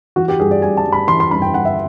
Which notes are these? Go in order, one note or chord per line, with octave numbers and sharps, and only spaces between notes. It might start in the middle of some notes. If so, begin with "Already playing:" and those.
E3 F#4
G4
G2 G#4
D5
G2 G#5
A5
G2
B5
E3 C6
C6
G2 B5
G5
G2 F#5
E5